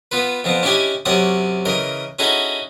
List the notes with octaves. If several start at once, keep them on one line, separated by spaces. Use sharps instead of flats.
B3 F4 B4
F2 F3 B3 C4
C#4 D4 E4 G4 D#5 G#5
F#2 C3 C#4 D5 F#5 D#6
C#3 E3 A#4 D#5
C#4 D#4 E4 F#4 G#4 A4